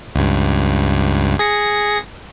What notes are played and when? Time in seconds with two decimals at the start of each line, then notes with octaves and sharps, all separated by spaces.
0.15 C#2 G2
1.39 G#4 A#6 C#7